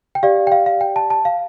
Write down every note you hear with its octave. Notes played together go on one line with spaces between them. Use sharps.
G5
G4 D5 F5
G5
F5
F5
G5
A5
A5
F5